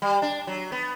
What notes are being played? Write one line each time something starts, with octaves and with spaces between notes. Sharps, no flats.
G3
D4
F#3
B3